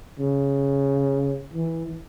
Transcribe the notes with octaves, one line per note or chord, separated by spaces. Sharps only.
C#3
E3